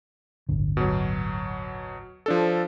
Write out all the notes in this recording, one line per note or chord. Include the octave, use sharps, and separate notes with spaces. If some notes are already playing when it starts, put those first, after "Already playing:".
D1 G1 D3
B2 F#3
F3 D4 A4